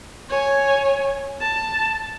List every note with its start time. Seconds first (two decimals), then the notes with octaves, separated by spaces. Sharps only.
0.29 C#5 G#5
1.41 A5